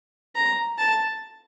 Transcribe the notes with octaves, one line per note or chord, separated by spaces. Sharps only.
A#5
A5